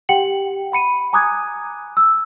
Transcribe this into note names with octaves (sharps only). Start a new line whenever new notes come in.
G4 F#5 G5 C#7 F#7
F#5 B5 C#7 D#7
G#5 A#5 D6 D#6 F#6 G#6
E6